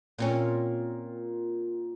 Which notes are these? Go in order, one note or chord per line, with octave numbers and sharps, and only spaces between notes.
A#2 C4 C#4